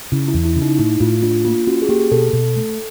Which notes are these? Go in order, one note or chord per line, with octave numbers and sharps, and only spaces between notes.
C#3 E4
E4
E2
E4
C#3
D#4
A2 E4
A2 F4
D4 F4
A#3 F4
C#4 F#4
G#4
A#3 G4
B2 A4
B2
A3